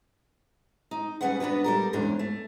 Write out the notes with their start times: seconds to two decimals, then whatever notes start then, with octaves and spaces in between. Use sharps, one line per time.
0.91 D#4
1.21 G3 C#4 G#4 B4 F#5
1.40 B3 D4 F#4 B4
1.64 G3 A4 A#4
1.93 E2 G#2 C#4 D4
2.19 A3